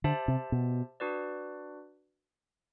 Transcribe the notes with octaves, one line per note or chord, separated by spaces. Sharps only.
D3 G4 C5 E5 A5
C3
B2
D4 F#4 B4 D5